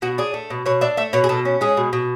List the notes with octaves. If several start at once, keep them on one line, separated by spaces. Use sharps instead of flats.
B2 F#4
D4 G#4
A3
B2
B2 C#5
D4 E5
A3 E5
B2 C#5
G#4
B2 A4
C#4
G#3 G#4
B2
B2